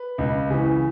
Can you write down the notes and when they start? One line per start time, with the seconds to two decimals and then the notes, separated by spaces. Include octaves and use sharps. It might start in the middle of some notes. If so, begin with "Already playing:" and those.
Already playing: B4
0.18 C#2
0.50 C#3 E3